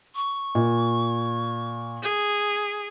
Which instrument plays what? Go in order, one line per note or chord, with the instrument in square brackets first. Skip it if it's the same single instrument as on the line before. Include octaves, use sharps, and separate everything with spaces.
[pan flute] C#6
[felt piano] A#2
[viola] G#4